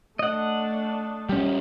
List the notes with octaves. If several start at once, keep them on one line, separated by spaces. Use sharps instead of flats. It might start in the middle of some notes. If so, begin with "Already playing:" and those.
A3 D4 D#5 F#5
G3 C#4